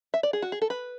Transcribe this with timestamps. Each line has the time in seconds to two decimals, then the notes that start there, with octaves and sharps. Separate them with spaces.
0.14 E5
0.23 D5
0.33 G#4
0.42 F#4
0.52 G#4
0.62 A4
0.70 B4